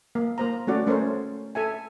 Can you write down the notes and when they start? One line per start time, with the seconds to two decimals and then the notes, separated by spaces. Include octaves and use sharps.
0.15 A#3
0.38 A#3 C5 A#5
0.67 A3 C#4 F#4 D5
0.87 A3 C#4 A#4 C5 C#5
1.55 A4 E5 G#5